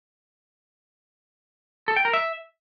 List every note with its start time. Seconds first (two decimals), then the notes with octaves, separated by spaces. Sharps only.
1.88 A4
1.96 G5
2.05 A#4
2.13 E5